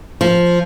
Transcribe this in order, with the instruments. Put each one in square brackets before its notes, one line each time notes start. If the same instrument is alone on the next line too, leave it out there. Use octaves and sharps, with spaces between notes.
[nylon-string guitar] F3